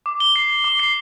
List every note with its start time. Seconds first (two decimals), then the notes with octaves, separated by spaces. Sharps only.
0.06 D6
0.20 G7
0.36 C7
0.50 C7
0.64 D6
0.80 C7